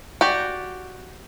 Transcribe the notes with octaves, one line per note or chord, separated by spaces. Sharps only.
F#4 G4 D5